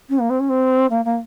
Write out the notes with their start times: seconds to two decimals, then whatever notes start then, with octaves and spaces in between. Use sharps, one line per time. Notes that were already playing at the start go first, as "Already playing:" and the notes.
0.09 C#4
0.19 A#3
0.30 C4
0.40 C#4
0.49 C4
0.90 A#3
1.05 A#3